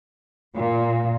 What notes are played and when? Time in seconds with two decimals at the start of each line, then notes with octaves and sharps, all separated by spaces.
0.57 A#2